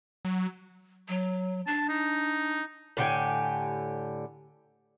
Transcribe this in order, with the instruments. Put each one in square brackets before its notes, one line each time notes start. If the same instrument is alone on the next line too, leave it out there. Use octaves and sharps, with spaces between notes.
[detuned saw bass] F#3
[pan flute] F#3
[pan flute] D4 [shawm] A5
[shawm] D#4
[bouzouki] A2 D3 G4 G#5